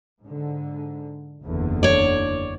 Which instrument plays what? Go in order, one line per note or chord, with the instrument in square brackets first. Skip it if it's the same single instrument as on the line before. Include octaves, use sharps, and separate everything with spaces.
[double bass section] G#2 D3
F#1 E2 D3
[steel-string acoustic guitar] C#5 D5